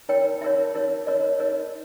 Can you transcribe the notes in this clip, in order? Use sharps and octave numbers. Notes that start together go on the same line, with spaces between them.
D#4 A#4 C#5 G5
D#4 A#4 C#5 E5
D#4 A#4 C#5
D#4 A#4 C#5 D#5
C#5
D#4 A#4 C#5 D#5